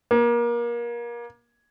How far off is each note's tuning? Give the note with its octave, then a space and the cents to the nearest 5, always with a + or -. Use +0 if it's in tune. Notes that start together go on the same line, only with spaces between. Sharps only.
A#3 +30